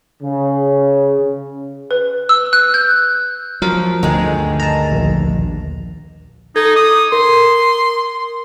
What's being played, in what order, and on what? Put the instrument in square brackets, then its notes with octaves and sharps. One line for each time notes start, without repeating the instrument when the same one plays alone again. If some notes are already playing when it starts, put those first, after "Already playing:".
[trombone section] C#3
[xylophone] B4
E6
F#6
G6
[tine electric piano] F3 A#4 [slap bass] F#3
[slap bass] D2 G2 D3 [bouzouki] D#3 G#3
[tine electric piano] A5 A#5
A#1 D#2
[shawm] D#4 [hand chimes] A4 G#6
[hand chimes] D6 [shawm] D#6
[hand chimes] A#4 [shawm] C6